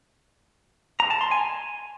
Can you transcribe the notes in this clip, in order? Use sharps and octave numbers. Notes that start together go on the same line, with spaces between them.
A#5
A5
C6
G#5